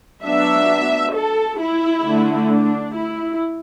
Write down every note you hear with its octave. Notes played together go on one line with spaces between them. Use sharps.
F#3 B3 D4 E5
A4
E4
D3 A3 D4
D4
E4